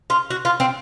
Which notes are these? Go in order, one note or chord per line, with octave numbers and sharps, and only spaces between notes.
F4
F#4
F4
C4